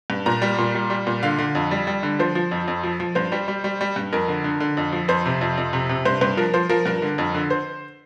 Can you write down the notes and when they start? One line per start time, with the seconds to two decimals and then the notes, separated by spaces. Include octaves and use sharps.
0.10 G2
0.26 A#2 A#5
0.42 G3
0.58 A#2
0.75 G3
0.90 G3
1.07 A#2
1.23 D3 F5
1.39 D3
1.55 F2
1.71 G3
1.87 G3
2.03 D3
2.19 F3 C5
2.35 F3
2.51 F2
2.68 F2
2.83 F3
3.00 F3
3.15 G2 C5
3.32 G3
3.48 G3
3.64 G3
3.81 G3
3.96 G2
4.13 F2 A#4
4.28 D3
4.44 D3
4.60 D3
4.77 F2
4.93 F3
5.08 F2 C5
5.26 C3
5.41 F2
5.57 F2
5.73 C3
5.89 C3
6.05 G2 C5
6.21 G2 C5
6.37 F3 A#4
6.54 F3 C5
6.69 F3 A#4
6.86 G2 A#4
7.02 D3
7.18 F2
7.34 D3
7.50 C5